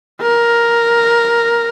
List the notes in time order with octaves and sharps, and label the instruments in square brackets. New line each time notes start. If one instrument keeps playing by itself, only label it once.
[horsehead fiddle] A#4